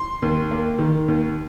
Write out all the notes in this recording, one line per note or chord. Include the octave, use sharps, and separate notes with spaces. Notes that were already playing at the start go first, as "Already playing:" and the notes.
Already playing: C6
D#2
A#3
D#3
D#2